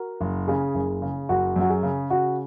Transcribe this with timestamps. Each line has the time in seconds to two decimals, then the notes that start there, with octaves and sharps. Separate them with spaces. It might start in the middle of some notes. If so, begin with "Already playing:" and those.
Already playing: F#4 A#4
0.21 F#1
0.48 C#3 G#4
0.75 F#1
1.02 C#3
1.29 F#1 F#4
1.56 F#2 F#4
1.70 G#4
1.83 C#3
2.10 C#3 F#4